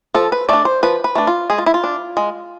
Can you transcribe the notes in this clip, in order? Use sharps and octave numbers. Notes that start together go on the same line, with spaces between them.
F3 A4
B4
A3 D4 D5
C5
F3 B4
B4
A3 D4
F4
G#3 G#4
F4
E4
F4
D4
G#3